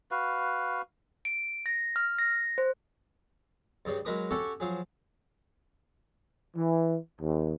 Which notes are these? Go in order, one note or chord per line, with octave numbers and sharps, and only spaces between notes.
F#4 B4 F5
D7
A#6
F6
A#6
C5
G2 C#3 G3
F#3 G#3 A#4 B4 A#5 D#6
C#4 F#4 G4 A4 C#5
F3 F#3 G#4
E3
D#2